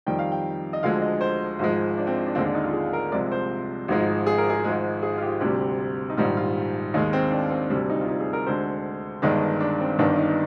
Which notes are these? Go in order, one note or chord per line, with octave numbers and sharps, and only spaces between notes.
F2 D#3 G3 G5
F5
G5
D#5
D2 D3 F3 G#3 F5
D#5
C5
G#1 G#2 F3 G#3
D4
C4
D4
D#2 D3 G#3 C4
D4
D#4
F4
G#4
A#4
C2 C3 F3 G#3 D5
C5
G#1 G#2 F3 G#3
G#4
A#4
G#4
G#1 G#2 F3 G#3
G#4
F4
G4
D2 C3 G3 G4
D#4
A#1 G#2 D#3 G3 F4
F4
D#2 D#3 G#3 D#4
C4
D4
C4
D2 C3 G3 D4
D#4
F4
D#4
G#4
A#4
D2 D3 G#3 C5
G1 G2 D#3 G#3 D4
D4
C4
G1 G2 D#3 D4
D4
D#4